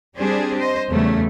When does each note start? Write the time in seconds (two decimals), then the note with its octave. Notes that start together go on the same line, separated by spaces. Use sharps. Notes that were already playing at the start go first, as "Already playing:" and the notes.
0.17 G3 C4 D4 G4 G#4 C5
0.59 C5 D#5
0.90 E2 C#3 F#3 G3 A3 C#4